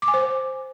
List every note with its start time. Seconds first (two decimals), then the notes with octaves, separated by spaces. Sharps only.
0.02 D6
0.08 G#5
0.14 C5